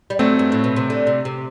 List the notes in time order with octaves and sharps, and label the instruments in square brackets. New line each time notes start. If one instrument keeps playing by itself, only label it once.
[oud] G3
[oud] F#3 [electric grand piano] A3 C4
[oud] G2
A2
B2
C3
D3
C3
C3